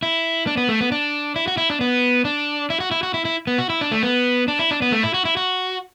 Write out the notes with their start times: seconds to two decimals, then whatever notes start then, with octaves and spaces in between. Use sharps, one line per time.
0.03 E4
0.47 D4
0.57 B3
0.69 A3
0.81 B3
0.92 D4
1.36 E4
1.48 F#4
1.57 E4
1.70 D4
1.81 B3
2.25 D4
2.70 E4
2.80 F#4
2.91 E4
3.03 F#4
3.14 E4
3.25 E4
3.47 B3
3.58 F#4
3.70 E4
3.81 D4
3.92 A3
4.03 B3
4.48 D4
4.59 E4
4.71 D4
4.82 B3
4.92 A3
5.03 E4
5.14 F#4
5.25 E4
5.37 F#4